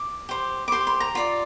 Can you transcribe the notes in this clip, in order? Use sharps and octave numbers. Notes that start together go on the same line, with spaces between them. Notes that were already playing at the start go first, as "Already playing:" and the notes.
Already playing: D6
G4 C5
D6
G4 C5 C6
C6
A#5
F4 D5